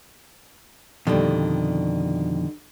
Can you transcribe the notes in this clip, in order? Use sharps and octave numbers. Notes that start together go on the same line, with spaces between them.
F2 B2 D3 D#3 G3